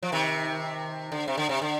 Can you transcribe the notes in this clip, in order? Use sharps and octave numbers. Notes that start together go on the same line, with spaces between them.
F3
C3 D#3
D3
C3
D3
C3
D3